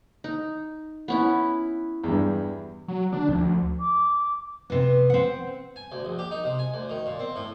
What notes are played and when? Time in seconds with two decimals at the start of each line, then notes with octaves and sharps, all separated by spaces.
0.24 D#4
1.08 B3 C#4 E4
2.04 E2 G2
2.88 F#3
3.12 D3 D4
3.29 D2 F3
3.80 D6
4.70 C3 B3
5.10 C4 F#5
5.76 G#5
5.92 D2
6.05 A#1
6.19 G4
6.31 D#4
6.44 C3
6.59 G#5
6.74 D2
6.90 D#3
7.06 A#2
7.19 C4
7.36 A2